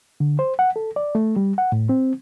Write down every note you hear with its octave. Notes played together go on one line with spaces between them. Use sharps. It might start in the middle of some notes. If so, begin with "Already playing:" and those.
D3
C5
F#5
A4
D5
A3
G3
F#5
A2
C4